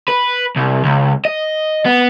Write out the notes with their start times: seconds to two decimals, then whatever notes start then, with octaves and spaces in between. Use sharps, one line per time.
0.09 B4
0.57 C2
0.85 C#2
1.25 D#5
1.86 B3